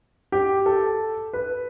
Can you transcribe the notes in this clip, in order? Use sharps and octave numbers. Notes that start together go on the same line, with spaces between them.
G4
A4
B4